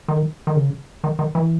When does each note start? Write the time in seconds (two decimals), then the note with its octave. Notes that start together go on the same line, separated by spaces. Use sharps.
0.08 D#3
0.47 D#3
0.56 C#3
1.04 D#3
1.19 D#3
1.35 E3